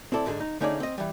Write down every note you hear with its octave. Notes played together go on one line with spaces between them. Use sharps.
C4 E4 A4 D5
G#2 D3 G#4 A4
D#4
D3 A3 C#4 D#4 G#4 D5
C4 D#5
E3 G3